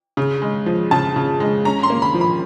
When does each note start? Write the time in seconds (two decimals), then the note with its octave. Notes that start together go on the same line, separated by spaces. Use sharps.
0.17 C#3
0.42 G#3
0.66 F3
0.91 C#3 A5
1.16 C#3
1.40 G#3
1.65 C#4 A#5
1.83 C6
1.90 A#3
2.02 B5
2.14 F3
2.21 B5